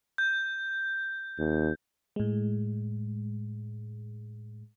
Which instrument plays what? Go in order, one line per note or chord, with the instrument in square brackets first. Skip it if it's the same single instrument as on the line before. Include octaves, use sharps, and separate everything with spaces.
[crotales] G6
[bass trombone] D#2
[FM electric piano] A2 G#3